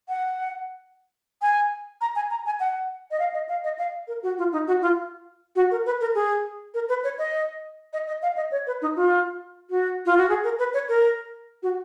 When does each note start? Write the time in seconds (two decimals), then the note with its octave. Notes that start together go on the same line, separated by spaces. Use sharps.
0.09 F#5
1.42 G#5
2.01 A#5
2.16 G#5
2.31 A#5
2.46 G#5
2.60 F#5
3.11 D#5
3.20 F5
3.34 D#5
3.49 F5
3.64 D#5
3.79 F5
4.08 A#4
4.23 F#4
4.38 F4
4.52 D#4
4.67 F#4
4.82 F4
5.56 F#4
5.71 A#4
5.86 B4
6.01 A#4
6.15 G#4
6.74 A#4
6.89 B4
7.04 C#5
7.18 D#5
7.93 D#5
8.07 D#5
8.22 F5
8.37 D#5
8.52 C#5
8.67 B4
8.82 D#4
8.96 F4
9.70 F#4
10.06 F4
10.18 F#4
10.29 G#4
10.44 A#4
10.59 B4
10.74 C#5
10.89 A#4
11.63 F#4